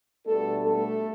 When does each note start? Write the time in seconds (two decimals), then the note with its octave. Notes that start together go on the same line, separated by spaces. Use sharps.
0.25 B2 G3 A3 B3 D4 A4
0.62 A3 A4